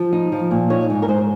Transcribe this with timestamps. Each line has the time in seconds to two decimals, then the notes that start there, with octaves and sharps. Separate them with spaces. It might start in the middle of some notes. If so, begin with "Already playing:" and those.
Already playing: F3
0.13 D#4
0.32 F3
0.51 A#2
0.70 D#4 C#5
0.90 G#2
1.02 A#4
1.08 G#2 C5